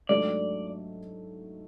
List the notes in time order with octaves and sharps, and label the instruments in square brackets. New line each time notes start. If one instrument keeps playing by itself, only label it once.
[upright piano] G#2 F#3 A3 D4 F#4 [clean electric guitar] D5